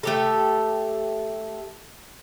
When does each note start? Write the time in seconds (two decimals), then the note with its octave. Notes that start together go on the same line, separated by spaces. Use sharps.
0.03 A3 G4 A4